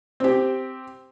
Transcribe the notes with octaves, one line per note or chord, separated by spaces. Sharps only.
C4 G4